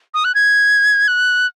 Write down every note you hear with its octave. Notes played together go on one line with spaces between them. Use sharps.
D#6
F#6
G#6
F#6